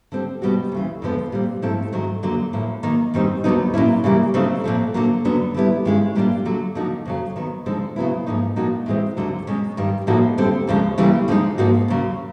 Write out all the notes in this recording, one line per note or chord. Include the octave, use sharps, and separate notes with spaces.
D3 G3 C4
B2 G3 B3 D4 F#4
D2 C#3 E3
F2 D3 F3 G#3 B3
A#2 G3 C4 F4
G#2 F3 A3 C4 E4
G#2 D#3 F#3 A3
F2 D3 F#3 A#3
A2 F3 A#3
D#3 F#3 A#3
F#2 D#3 G3 C4 D#4
D#2 D3 F#3 B3 D#4
A#2 F#3 A#3 C#4 E4
C#3 E3 G3 A#3
C#3 F#3 A3 C4 D#4
A#2 F3 A3
D3 F#3 A#3
F#2 D3 F#3 B3 D4
D3 G3 B3 E4
G2 D#3 G#3 C#4 E4
A#2 G3 A#3 D4 F4
D3 F#3 A3
D3 F3 A#3 D#4 F#4
F2 C#3 F#3
D#3 F#3 B3
D3 F3 G#3 C4 D#4
C#3 F#3 B3 E4
G#2 F3 A#3 D#4
A#2 F3 A#3 D#4 F#4
A2 E3 G#3 C4
D#2 D3 F#3
B2 G#3 C#4
G2 D#3 G3
A2 F3 A#3 D#4 F#4
F2 D3 G3 C4
D#2 C#3 F3 G#3
D2 C#3 E3 G3 A#3
D3 F3 G#3 C4 D#4
G#2 F3 A#3 D#4 F#4
D#2 C#3 F#3